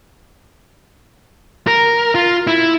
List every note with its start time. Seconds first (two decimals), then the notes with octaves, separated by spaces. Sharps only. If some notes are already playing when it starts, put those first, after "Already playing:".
1.67 A#4
2.15 F4
2.47 E4